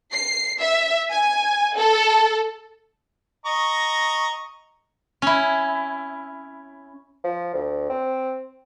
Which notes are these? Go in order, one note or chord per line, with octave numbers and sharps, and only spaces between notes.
C7
E5
G#5
A4
D#5 A#5 C#6
C#4 E4
F3
D2
C4